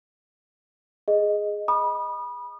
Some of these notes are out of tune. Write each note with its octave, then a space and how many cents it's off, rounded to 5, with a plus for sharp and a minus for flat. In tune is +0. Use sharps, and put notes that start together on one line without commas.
G#4 +0 D#5 +0
B5 -25 D#6 -30